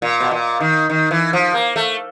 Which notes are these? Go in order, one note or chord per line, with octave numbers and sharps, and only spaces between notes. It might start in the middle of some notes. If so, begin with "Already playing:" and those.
A#2
B2
A#2
D#3
D#3
E3
F3
A#3
A3